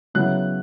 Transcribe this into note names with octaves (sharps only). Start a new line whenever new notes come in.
C#3 F#3 B3 E4 F#6